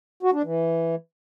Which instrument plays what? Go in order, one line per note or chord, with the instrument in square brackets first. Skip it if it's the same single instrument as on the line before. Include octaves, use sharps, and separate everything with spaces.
[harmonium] F#4
D4
E3